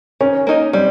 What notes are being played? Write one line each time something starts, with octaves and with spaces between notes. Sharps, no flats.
D#3 C#4
A#3 D#4 A#4 D#5
G3 C4